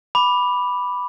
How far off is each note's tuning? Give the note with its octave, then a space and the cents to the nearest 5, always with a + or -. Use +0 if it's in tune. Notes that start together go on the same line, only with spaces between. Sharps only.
B5 +0 D6 +0